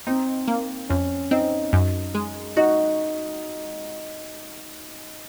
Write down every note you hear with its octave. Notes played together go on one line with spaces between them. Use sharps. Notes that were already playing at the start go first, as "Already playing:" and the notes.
C4 D#4
A#3
F2 C#4
C4 D#4
F#2
G#3
D#4 F#4